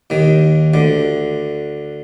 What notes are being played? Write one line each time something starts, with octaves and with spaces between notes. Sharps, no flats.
D#2 D#3
D2 D3